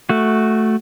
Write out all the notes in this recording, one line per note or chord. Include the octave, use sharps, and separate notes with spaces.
A3 F#4